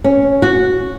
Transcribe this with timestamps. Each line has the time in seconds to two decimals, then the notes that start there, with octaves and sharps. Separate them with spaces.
0.04 C#4
0.42 F#4